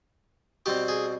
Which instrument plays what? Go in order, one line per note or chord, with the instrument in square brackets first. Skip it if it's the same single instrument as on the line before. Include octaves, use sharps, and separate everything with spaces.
[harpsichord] B2 G3 C4 G4
G#4